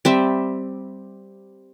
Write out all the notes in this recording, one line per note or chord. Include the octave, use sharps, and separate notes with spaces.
G3 C4 E5